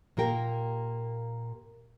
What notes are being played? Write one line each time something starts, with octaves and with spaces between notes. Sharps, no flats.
A#2 A#3 G4 A#4 G5